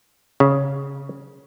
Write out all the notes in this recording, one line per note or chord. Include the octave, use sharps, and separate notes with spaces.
C#3